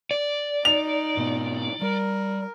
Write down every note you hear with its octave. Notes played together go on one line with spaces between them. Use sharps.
D5
D#4 F7
G#2 B2 B3
G3 A#4